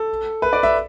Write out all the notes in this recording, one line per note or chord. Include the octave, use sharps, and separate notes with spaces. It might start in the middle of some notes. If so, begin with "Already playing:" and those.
Already playing: A4
B4
D5
E5